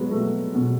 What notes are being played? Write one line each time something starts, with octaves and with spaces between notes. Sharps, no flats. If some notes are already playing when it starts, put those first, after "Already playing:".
Already playing: F#3 G#3 B3
A3
B2